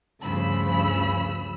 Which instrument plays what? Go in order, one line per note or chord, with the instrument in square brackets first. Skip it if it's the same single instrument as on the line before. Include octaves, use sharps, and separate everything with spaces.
[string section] D2 G2 C#3 F3 B5 E6